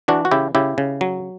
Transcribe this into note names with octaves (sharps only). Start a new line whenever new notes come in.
E3 D4 F#4
F#4
C#3 E4 G4
C#3 E4 G4
C#3
F#3